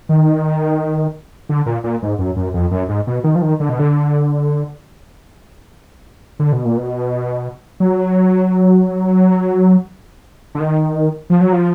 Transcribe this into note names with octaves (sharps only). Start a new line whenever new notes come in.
D#3
D3
A#2
A#2
G#2
F#2
F#2
F2
F#2
G#2
B2
D#3
F3
D#3
D3
B2
D3
D3
B2
A#2
B2
F#3
D3
D#3
F3
F#3
F3